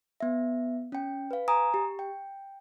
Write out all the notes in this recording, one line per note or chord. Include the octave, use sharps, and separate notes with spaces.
B3 E5
C#4 G5
B4 F5
G#5 A#5 D#6
G4
G5